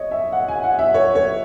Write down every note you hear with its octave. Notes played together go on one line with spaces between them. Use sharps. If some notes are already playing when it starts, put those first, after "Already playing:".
Already playing: C#5 D#5
E5
F#5
G#5
F#5
E5
C#5
C#5